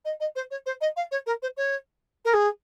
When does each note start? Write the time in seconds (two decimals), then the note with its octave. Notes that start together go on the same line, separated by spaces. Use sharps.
0.05 D#5
0.20 D#5
0.36 C5
0.51 C#5
0.66 C5
0.81 D#5
0.96 F5
1.11 C#5
1.26 A#4
1.42 C5
1.57 C#5
2.25 A#4
2.34 G#4